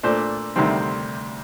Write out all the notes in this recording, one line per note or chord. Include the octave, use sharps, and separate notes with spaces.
A#2 A3 D4 C5
D2 C3 D#3 G3 C4